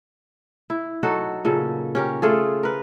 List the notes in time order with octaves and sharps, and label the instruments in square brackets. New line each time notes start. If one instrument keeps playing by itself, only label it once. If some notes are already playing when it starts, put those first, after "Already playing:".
[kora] E4
F#3 D#4 F#4 A4
A#2 C#3 A4
C#4 G4 A#4
A3 F4 G#4 A4
A#4 B4